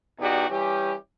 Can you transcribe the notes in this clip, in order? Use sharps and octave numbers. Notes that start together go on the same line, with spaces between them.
E2 B2 D#4 F#4 G4 D5
E3 G3 C#4 G4